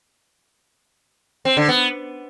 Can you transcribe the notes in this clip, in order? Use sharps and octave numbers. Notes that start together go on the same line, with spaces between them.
C4
D3
B3